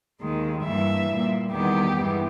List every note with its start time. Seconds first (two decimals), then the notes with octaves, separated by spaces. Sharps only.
0.19 D#2 D#3 G#3
0.63 G2 E3 A#3 E5
1.08 A#2 G3 A#3
1.50 E2 D#3 G3 B3 G4
1.95 G2 E3 G#3 B3